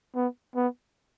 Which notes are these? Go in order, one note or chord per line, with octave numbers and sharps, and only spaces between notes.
B3
B3